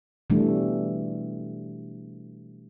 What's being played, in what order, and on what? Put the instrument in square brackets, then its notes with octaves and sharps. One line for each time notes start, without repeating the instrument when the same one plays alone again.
[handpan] B2 E3 G3 A3 D4